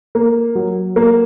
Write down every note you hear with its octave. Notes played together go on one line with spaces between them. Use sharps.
A#3
F#3
A#3